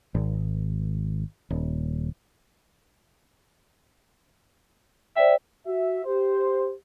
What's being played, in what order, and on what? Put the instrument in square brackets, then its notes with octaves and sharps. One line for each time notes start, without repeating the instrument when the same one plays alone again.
[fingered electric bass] G#1
D#1
[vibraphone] C5 D5 G5 [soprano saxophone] E5
[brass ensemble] F#4 E5
G4 C5